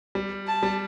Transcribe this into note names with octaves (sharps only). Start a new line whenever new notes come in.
G3
A5
G3